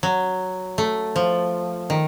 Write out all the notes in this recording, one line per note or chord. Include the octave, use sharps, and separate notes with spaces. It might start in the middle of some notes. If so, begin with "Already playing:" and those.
F#3
A3
F3
D#3